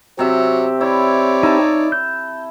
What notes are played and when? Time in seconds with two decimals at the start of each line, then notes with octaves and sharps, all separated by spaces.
0.19 C3 F#3 C4 G4 E5 C#6
0.81 E4 C#5 D5
1.43 D#4 E4 A5
1.92 G6